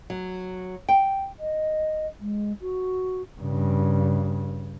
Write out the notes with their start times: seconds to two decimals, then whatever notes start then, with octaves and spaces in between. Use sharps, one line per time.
0.10 F#3
0.89 G5
1.37 D#5
2.20 G#3
2.61 F#4
3.41 G2 C#3